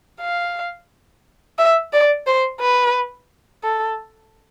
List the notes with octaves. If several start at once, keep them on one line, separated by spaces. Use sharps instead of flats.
F5
E5
D5
C5
B4
A4